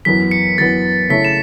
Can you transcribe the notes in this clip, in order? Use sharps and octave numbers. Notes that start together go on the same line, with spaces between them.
F#2 E3 B3 B6
C#7
F#2 E3 B3 A6
C#3 A3 E4 C#5 E5 B6
E7